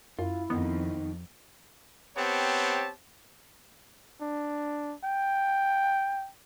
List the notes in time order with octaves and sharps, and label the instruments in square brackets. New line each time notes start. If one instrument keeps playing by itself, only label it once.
[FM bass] F#2 [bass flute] E4 [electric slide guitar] F4
[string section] F2 [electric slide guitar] D#3 D#4 [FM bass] B3
[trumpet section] B3 C4 G4 C#5 A5
[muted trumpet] D4
G5